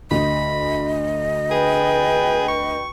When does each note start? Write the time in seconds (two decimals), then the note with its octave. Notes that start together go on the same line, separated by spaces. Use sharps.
0.11 D2 D#5 B5
1.51 G#4 B4 G5
2.48 C#6